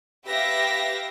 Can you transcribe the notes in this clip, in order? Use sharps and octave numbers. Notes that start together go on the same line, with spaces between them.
G4 B4 E5 F5 A#6